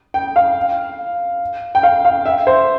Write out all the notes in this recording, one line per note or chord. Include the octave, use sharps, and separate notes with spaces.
G5
F5
G5
F5
F5
E5
C5